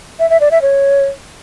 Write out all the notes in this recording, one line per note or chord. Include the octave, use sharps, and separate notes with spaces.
E5
E5
D5
E5
C#5